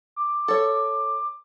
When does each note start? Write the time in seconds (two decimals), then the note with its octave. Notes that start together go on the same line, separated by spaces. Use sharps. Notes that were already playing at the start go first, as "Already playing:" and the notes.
0.16 D6
0.48 A4 C#5